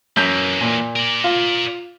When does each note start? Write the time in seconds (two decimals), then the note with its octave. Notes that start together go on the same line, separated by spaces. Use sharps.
0.17 F#2 E3 A#3 G6 B6
0.61 A#2
0.96 A#4 D5
1.24 F4